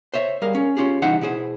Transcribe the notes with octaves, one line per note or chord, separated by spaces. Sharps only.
C5 C#5 E5
G3 G#4 A#4 F5
C#4
C#4 F4 G4 G#4
C2 E3 D#4 E5 F#5 C6
B2 E4 G#4 C5